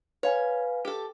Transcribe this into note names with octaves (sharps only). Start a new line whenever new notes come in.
B4 C#5 F5 G#5
G4 A4